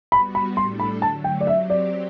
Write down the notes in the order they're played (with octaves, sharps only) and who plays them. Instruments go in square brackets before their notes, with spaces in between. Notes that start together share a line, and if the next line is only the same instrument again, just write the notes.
[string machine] G3 B3 F#4 [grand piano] B5
[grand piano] B5
[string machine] A2 G3 D4 A4 [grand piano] C6
[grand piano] B5
[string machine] D3 F#3 A3 [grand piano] A5
[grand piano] G5
D5
[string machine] F#3 C4 G4 [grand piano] E5
[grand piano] D5